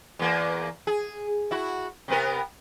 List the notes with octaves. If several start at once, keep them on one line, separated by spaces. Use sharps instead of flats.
E2 A#3
G#4
E4 F#4
C3 B3 A#4